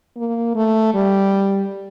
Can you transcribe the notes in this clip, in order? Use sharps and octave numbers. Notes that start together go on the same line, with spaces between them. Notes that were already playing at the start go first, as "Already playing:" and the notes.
A#3
A3
G3